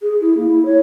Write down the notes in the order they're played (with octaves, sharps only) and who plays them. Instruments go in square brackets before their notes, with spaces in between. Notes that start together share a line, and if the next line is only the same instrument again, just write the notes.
[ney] G#4
E4
A#3
E4
C#5